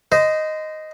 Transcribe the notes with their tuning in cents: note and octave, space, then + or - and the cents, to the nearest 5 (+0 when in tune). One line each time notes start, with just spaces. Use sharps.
C5 -25 D#5 +0